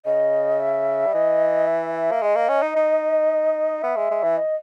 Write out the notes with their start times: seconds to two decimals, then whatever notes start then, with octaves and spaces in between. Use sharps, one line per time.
0.05 C#3 D#5
0.60 E5
1.06 G3
1.13 E3 D#5
1.67 E5
1.95 E5
2.11 A#3
2.21 G#3 E5
2.26 D#5
2.35 A#3
2.49 C#4
2.62 D#4
2.76 D#4
3.83 B3 E5
3.97 G#3
4.11 G#3
4.23 E3
4.37 D#5